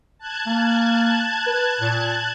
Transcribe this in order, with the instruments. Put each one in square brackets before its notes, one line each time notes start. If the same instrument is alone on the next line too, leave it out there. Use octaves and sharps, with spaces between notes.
[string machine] A5 F#6 G#6
[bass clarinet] A#3
B4
A#2